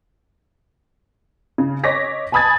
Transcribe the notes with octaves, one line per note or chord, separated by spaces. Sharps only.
C#3
C#5 D#5 D6 A#6 B6
G#5 A5 B5 D#6 G#6 A6